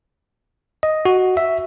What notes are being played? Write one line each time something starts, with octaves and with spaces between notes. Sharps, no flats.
D#5
F#4
E5